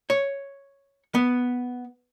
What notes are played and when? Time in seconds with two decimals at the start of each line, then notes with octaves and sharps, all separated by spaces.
0.10 C#5
1.15 B3